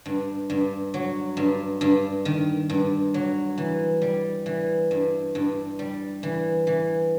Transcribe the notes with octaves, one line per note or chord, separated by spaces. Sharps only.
G2
G2
F#3
G2
G2
D#3
G2
F#3
E3
G3
E3
G2
G2
G3
E3
E3